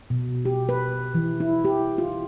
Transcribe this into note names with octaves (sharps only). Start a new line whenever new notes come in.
B2
G4
B4
E3
E4
G4
F4